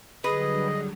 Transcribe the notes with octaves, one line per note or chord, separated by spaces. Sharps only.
D3 F#3 G3 G#4 B4 D#5